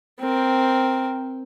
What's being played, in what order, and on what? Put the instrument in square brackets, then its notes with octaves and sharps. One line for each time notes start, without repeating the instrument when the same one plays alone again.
[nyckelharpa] C4 A#4